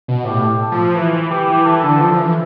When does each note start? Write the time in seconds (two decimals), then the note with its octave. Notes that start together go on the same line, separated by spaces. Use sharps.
0.08 B2
0.25 A2 G4
0.60 A4
0.72 F3
0.95 E3
1.13 E3
1.30 E3 G4
1.48 E3
1.66 E3 A4
1.83 D3
2.00 F3
2.19 E3